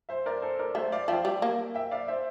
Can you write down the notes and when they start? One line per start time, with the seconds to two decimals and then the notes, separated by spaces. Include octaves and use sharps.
0.09 C5 E5
0.26 A#4 D5
0.42 A4 C5
0.59 A#4 D5
0.75 A3 C5 E5
0.92 D5 F5
1.08 F3 E5 G5
1.25 G3
1.42 A#3
1.75 E5 G5
1.91 D5 F5
2.08 C5 E5